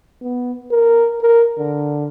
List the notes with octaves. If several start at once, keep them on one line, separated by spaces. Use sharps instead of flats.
B3
A#4
A#4
D3